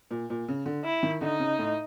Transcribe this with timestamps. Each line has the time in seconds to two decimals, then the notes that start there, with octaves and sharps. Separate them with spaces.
0.11 A#2
0.30 A#2
0.48 C#3
0.66 D3
0.84 E4
1.03 D#3
1.21 D3 D#4
1.40 C#3
1.59 A2